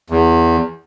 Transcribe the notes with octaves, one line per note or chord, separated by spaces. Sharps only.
E2